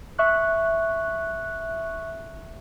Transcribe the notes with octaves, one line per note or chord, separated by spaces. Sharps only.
E5 C#6 F#6